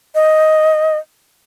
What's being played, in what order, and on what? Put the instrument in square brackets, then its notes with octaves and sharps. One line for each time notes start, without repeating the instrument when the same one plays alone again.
[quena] D#5